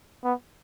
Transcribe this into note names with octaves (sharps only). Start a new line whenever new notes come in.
B3